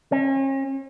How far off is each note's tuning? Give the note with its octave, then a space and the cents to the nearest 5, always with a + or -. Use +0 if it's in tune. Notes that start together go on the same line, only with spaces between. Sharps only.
C#4 -40